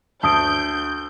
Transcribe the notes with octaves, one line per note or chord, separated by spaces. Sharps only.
D2 A5 D#6 G6 D7